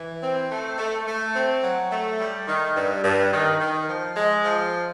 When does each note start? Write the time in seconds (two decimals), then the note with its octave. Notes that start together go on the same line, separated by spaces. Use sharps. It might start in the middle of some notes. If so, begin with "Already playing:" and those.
Already playing: E3
0.23 C4
0.51 A3
0.78 A3
1.07 A3
1.35 C4
1.63 F#3
1.92 A3
2.20 G3
2.48 D#3
2.76 G2
3.04 G2
3.33 D#3
3.60 D#3
3.89 F3
4.17 G#3
4.45 F3